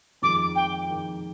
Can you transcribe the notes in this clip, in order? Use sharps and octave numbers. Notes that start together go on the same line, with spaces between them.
F2 D#3 G#3 D6
G5
F2 D#3 G#3